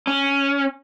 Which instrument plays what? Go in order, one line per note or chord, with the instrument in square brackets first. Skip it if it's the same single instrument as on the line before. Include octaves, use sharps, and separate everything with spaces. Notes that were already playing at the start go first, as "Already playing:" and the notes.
[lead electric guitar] C#4